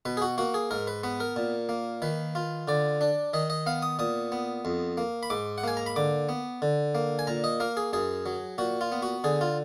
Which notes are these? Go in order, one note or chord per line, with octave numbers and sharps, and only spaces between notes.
B2 B4
G#4
F#4
A#3 F#4
G#4
G#2 A#4
B4
B3 B4
A#4
A#2
A#3
D#3 B4
F4
D3 D5
D4
D#3 D#5
D#5
B3 F5
D#6
A#2 D#6
B3
F2
A#3
B5
G#2 D6
F#5
A#3 G#5
A#5
B5
D3 D6
B3
D3
A#3
G#5
A#2 A#5
D#5
A#3 A#4
G#4
F#2 G#4
F#3
A#2 F#4
F4
B3
F#4
D3 G#4
F4